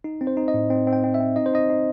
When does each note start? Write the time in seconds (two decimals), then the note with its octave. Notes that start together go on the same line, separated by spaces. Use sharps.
0.04 D#4
0.21 C4
0.27 C5
0.37 D#4
0.48 D#5
0.54 A2
0.70 C4
0.87 C4
0.93 G5
1.04 C4
1.14 E5
1.20 C4
1.36 D#4 D#5
1.46 C5
1.53 D#4 D#5
1.70 D#4